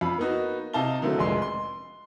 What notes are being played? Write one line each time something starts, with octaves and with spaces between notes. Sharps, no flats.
F2 F5 B5
A#3 B3 D#4 F#4
C3 D#4 F5 A5 A#5 G7
D3 D#3 F#3 A3 A#3 C4
F1 A#1 G#3 C6
C6